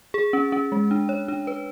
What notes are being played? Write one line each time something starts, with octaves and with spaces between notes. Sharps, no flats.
G#4
C#4
C#4
G#3
D4
C#5
D4
B4